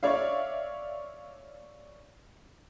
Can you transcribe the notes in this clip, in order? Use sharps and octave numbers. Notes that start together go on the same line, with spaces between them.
C#5 D5 E5 F5